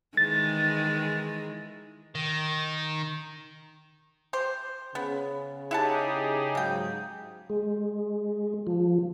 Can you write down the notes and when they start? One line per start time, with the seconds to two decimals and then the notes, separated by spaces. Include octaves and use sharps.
0.17 D#3 E3 G#3 A6
2.15 D#3
4.33 G4 C5
4.95 C#3 B3
5.71 D#4 E4 G4 G#4 F#5 A5
6.55 G#2 C#3 F#3 G5
7.50 G#3
8.67 F3